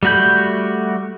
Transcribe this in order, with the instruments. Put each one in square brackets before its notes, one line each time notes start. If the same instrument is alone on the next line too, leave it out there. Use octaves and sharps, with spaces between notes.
[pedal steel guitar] G3 A3 F#4 B5 G6